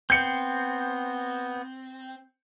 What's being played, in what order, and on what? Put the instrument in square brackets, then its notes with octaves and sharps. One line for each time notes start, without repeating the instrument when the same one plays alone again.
[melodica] B3 [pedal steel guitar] C4 [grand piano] G6 C#7